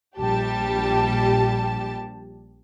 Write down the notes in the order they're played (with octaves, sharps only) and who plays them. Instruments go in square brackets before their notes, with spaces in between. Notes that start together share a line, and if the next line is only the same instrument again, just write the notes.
[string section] A#1 G3 G4 A5